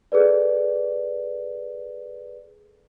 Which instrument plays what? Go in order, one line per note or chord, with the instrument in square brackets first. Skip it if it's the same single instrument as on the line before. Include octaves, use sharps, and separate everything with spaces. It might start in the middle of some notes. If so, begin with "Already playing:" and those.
[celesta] G#4 A4 B4 D5